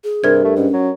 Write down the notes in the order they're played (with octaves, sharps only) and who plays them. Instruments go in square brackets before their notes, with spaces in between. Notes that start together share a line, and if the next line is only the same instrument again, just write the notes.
[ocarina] G#4
[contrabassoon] G2 [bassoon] C3 [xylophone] A#4 G#6
[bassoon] A3
[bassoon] G#2 [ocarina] C#4
[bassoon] F#3